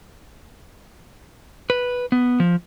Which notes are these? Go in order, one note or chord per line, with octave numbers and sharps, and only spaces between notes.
B4
B3
F3